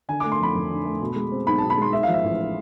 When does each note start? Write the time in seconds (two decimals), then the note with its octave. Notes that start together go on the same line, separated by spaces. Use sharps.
0.09 D3 G#5
0.20 A3 D6
0.32 C6
0.40 F2 B5
0.55 F2
0.70 D3
0.85 A3
1.01 B2
1.16 G#3
1.32 C4
1.47 B1 B5
1.58 B2 A5
1.70 B5
1.78 G#3 C6
1.93 G#2 E5
2.03 F3 F5
2.14 E5
2.24 A1